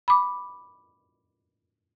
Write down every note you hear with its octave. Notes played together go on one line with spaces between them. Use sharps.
B5 D6